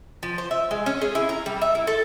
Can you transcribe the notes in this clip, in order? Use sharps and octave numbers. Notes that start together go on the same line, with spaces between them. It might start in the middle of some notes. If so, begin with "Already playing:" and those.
F3
C5
E5
G#3
C#4
G#4
E4
A#5
G3
E5
E4
A4